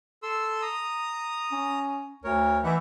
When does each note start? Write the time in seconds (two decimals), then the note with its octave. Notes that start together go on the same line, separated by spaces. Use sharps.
0.23 A4 C6 E6
0.62 A#5 D#6
1.52 C#4
2.24 D2 A#4 C#5
2.64 E3 D#4 E5 F#5